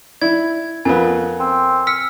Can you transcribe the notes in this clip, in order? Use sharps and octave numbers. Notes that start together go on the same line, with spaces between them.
E4 D5 G#6
F2 B3 A#4 F5 G#5
C4
E6 F6 B6 C#7